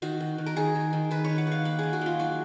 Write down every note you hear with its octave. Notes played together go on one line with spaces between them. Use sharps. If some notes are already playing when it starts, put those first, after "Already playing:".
D#3 F#4
D#3
D#3
A#4
D#3 G#4
D#3
D#3
D#3 B4
D#3 C#5
F#5
D#3 F5
A#3 F#5
D#3 G#4
F#4
A#3 F4
F#3 F#4